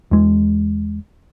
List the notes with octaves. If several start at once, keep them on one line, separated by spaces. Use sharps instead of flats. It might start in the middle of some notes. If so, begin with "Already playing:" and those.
E2 G#3